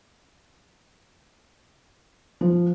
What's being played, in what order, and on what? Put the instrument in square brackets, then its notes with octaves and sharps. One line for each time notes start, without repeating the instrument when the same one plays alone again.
[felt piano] F3